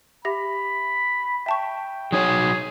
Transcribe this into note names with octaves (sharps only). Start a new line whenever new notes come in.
G4 E5 B5 A#6
E5 G5 A5 C#6
F#3 D#4 G#4 C#5